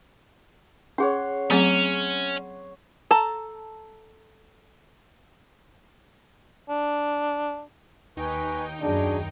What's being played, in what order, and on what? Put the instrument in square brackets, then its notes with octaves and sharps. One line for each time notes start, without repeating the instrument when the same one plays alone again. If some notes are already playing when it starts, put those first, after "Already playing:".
[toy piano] C#4 G#4 [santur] C#5 F#5 C6
[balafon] F#3 A3 C4 [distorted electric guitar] C#4 [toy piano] G#4 A#5
[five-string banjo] A4 A5 A#5
[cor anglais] D4
[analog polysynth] D#2 D#4 G5 [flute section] B4 G#5 C#6
[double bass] F#2 [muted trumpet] D4 [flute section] F#4 G#4